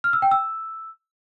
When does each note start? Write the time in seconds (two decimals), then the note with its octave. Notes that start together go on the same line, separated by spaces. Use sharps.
0.04 F6
0.13 E6
0.22 G5
0.31 E6